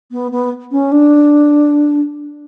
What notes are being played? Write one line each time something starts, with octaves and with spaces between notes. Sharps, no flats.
B3
B3
C#4
D4